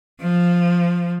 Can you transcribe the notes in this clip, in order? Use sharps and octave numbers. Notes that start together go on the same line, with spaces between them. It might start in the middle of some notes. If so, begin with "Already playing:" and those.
F3